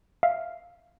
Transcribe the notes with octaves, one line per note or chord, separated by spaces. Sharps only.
E5 F5